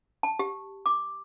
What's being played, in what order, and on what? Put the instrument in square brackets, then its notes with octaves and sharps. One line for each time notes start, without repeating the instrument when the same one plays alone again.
[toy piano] A5
G4
D6